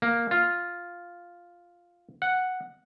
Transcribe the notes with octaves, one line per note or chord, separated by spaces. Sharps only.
A#3
F4
F#5